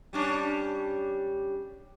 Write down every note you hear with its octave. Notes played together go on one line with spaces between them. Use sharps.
G3 C#4 D4